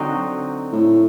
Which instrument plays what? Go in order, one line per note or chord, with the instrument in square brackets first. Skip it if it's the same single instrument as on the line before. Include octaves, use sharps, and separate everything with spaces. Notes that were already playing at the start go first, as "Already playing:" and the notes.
Already playing: [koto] D3 F#3 C4 D#4
[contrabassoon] A2